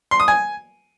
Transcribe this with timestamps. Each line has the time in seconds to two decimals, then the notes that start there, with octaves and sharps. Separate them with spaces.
0.11 C6
0.20 D#6
0.28 G#5